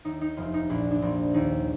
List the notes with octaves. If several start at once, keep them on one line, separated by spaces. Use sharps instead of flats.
D#2 D#4
D#4
F1 F4
D#4
A#1 D4
D4
A#1 C4
D#2 D#4